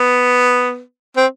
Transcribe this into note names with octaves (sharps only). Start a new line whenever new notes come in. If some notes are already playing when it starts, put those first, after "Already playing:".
Already playing: B3
C4